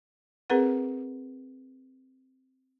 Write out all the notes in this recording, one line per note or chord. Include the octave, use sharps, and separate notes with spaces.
C4 G#4 A#4 B4 F#5